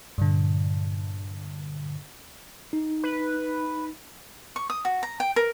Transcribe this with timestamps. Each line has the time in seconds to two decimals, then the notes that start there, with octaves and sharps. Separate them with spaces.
0.18 G2 A#2 D3
2.73 D#4
3.03 B4
4.56 C#6
4.70 D#6
4.85 F#4
5.03 A#5
5.20 G5
5.36 A#4